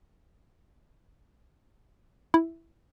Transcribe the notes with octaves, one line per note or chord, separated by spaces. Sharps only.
E4